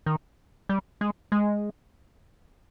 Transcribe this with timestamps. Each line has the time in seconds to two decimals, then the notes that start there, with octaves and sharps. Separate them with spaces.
0.06 D#3
0.69 G3
1.01 G#3
1.32 G#3